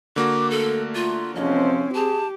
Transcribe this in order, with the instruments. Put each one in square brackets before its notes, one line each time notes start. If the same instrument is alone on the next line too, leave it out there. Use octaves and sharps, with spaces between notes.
[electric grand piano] D3 A#3 F#4 [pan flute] D6
[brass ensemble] A3 [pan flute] A4
[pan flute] F4
[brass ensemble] E2 C3 F3 [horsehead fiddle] C4 C#4 [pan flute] D#5
[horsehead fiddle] G4 [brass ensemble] G#4 [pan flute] A5